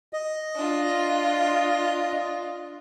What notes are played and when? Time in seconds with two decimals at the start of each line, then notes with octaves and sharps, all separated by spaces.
0.13 D#5
0.56 D4 F4